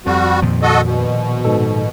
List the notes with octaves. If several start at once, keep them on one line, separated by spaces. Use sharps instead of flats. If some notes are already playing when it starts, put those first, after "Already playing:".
F2 F3 G3 F#4
A#2 D#3 F3
F#4 A4 D#5
B2
G#2 A4